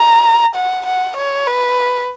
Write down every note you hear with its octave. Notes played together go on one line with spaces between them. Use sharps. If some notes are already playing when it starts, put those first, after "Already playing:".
Already playing: A#5
F#5
F#5
C#5
B4